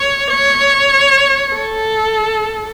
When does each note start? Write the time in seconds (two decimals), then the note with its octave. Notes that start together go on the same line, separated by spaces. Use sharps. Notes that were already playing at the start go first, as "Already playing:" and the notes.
Already playing: C#5
0.30 C#5
1.54 A4